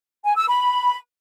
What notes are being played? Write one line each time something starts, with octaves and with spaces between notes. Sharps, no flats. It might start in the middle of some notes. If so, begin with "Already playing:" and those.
G#5
E6
B5